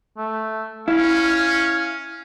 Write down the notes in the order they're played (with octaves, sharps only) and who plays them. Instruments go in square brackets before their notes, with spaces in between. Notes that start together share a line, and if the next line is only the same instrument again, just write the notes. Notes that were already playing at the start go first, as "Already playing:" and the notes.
[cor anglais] A3
[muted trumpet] C#4 [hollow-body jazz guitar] E4 [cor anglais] F5